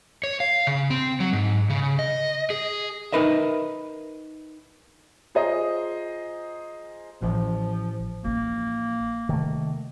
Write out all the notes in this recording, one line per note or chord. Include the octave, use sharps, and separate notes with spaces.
C#5
F5
C#3
C4
F#3
G#2
C#3
D#5
G#4
D#4 A#4 B4 D#5 E5
F4 G#4 C5 D#5 A#5 D#6
A1 F3
A1 F3 A#3
C3 D#3 A3